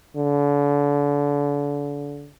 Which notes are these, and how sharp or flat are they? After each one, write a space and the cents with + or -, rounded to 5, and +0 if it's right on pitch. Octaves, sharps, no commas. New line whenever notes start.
D3 -35